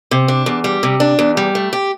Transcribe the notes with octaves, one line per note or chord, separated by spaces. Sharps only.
C3
D4
E2
G3
C3
D4
E2
G3
A3
G4